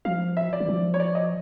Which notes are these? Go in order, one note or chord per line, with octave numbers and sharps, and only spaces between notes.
F3 F5
E5
D5
E3
F3
C#5
D5
D#5